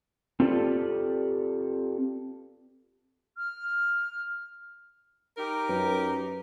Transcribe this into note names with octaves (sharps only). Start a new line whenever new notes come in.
C4 F4 G4 A4 B4 D5
F6
D#4 G4 A#4
F#2 B4